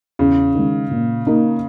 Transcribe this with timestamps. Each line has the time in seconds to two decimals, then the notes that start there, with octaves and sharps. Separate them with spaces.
0.19 E2 C#3
0.55 D#3 G#3
0.91 A#2
1.27 A#3 D#4